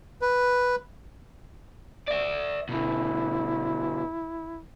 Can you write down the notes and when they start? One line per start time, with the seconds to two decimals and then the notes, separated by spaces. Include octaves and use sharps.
0.22 B4
2.08 D5 E5
2.69 B2 D3 E4